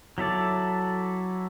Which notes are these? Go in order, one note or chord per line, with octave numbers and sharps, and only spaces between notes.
F#3 E4 A4 D5